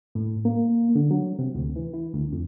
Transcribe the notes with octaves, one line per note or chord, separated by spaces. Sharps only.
A2
A#3
D3
F#3
C3
D2
E3
E3
D2
F2